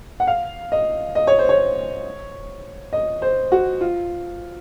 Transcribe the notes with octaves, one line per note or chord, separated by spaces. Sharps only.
F#5
F5
D#5
D#5
C#5
C5
C#5
D#5
C5
F#4
F4